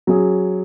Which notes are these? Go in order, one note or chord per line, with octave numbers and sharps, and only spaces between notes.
F#3 C#4 G#4